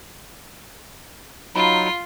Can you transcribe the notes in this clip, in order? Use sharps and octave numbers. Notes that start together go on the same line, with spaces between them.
F#3 D#4 F4 B5